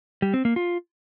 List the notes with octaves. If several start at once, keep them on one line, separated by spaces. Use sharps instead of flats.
G3
C4
A#3
F4